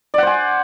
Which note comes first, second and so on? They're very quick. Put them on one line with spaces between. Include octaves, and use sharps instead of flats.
D5 F#5 C5 G#5